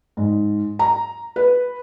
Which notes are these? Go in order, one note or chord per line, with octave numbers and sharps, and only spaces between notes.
G#2
A#5
B4